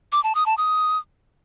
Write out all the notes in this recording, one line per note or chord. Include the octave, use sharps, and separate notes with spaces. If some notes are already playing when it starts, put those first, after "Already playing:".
D6
A5
D#6
A5
D#6